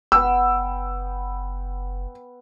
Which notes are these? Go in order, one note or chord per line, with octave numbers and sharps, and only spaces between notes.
F#1 B3 G5 E6